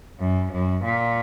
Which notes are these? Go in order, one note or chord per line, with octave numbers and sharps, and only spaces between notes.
F#2
F#2
A#2